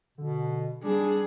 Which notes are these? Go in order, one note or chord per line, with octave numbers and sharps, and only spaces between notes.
B2 D3
G3 D4 G#4